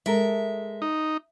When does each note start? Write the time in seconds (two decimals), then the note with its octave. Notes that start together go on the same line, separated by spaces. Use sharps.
0.06 G#3 A4 A#4 E5
0.82 D#4